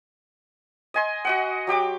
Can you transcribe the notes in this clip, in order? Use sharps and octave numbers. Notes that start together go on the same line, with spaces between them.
D#5 G#5 C6
F#4 D#5 F#5
F#3 G4 G5 D6